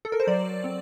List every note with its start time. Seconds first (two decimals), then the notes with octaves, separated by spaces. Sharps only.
0.05 A4
0.12 A#4
0.20 C5
0.27 F#3 D5
0.64 C4